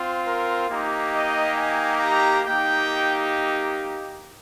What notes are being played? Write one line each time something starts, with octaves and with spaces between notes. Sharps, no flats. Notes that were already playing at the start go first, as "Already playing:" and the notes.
Already playing: C4 F4
A#4
A#3 D#4 G4
D#5
G#5
A#5
A#3 D#4 G4 G5